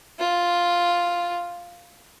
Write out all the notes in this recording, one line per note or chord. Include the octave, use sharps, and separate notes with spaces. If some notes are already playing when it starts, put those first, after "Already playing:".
F4